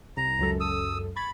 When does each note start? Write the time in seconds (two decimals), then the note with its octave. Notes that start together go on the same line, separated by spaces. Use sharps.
0.17 C2 A#5
0.39 C#2 F#2 A4
0.60 D#6 E6
1.16 B5 C#6 G#6 A6